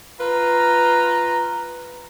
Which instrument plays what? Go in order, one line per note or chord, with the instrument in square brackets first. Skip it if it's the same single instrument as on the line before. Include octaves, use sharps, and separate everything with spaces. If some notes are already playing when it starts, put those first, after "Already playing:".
[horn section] F4 B4 A#5